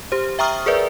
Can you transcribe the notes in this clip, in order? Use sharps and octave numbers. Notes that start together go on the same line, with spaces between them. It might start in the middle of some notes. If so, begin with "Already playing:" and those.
G4 C5
E5 G5 A#5 C#6 D#6 F6
G#4 A#4 B4 D5 E5